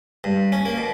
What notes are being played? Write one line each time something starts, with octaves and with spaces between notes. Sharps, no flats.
G2
C#4
A#3
B2